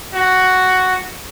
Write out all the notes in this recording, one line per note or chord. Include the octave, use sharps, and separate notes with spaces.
F#4